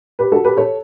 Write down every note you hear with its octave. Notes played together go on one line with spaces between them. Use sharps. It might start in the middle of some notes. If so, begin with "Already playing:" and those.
G4 B4
F#4 A4
G4 B4
A4 C#5